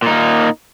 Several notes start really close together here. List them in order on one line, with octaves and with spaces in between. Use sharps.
A#2 D#4 A#3